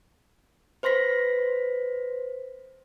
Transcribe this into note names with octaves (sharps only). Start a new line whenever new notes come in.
B4 C5 C6 A#6 B6